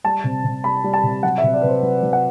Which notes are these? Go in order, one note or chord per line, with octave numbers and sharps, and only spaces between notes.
G3 A5
C3
C3
G3 B5
G3
A5
C3
F#3 F#5
E5
C3
D5
C3 B4
C5
F#3 B4
F#3
F#5